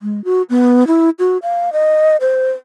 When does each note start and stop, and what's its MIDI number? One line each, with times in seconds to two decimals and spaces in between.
0.02 0.23 56
0.25 0.42 66
0.50 0.87 59
0.87 1.10 64
1.19 1.38 66
1.42 1.73 77
1.73 2.17 75
2.21 2.51 72